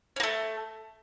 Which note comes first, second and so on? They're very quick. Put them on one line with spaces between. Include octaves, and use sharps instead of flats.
C#4 A#3 A3